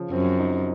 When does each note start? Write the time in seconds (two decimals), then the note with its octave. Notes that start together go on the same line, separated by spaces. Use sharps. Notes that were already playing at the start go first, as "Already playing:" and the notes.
Already playing: C#3 F3
0.12 F#2 C4
0.39 D#4